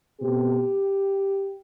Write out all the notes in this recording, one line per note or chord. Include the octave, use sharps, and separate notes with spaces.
B2 A3 C4 G4